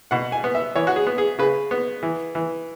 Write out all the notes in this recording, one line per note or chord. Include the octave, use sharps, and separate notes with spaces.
B2 F#5
G#5
B3
E5
E3 C#5
F#4
G#4
B3
G#4
C#3 B4
B3
E3
E3